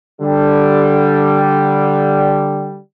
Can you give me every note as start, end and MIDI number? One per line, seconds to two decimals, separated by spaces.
0.20 2.77 50
0.20 2.77 55